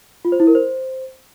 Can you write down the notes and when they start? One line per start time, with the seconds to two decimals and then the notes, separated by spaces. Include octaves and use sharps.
0.25 F4
0.32 C5
0.40 E4
0.47 A#4
0.55 C5